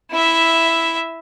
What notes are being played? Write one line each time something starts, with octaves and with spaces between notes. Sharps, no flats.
E4 E5